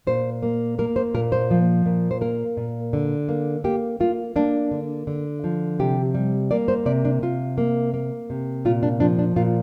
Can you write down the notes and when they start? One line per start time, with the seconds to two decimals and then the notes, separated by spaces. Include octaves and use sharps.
0.07 A#2 C5
0.43 A#3
0.79 A#3 A#4
0.96 C5
1.14 A#2 A#4
1.32 C5
1.51 F3
1.86 A#2
2.11 C5
2.21 A#3 A#4
2.57 A#2
2.93 D3
3.29 A#3
3.64 A#3 G4
4.00 A#3 F4
4.36 A#3 D4
4.71 D3
5.07 D3
5.44 F3
5.79 C3 G4
6.14 G3
6.51 A#3 D5
6.68 C5
6.86 C3 D5
7.05 D4
7.22 C3 F4
7.58 A#3
7.94 A#3
8.30 C3
8.65 A#2 F4
8.83 D4
9.00 F3 D4
9.19 D4
9.36 A#2 F4